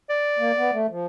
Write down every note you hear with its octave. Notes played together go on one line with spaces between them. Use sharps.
D5
A#3
B3
A3
F3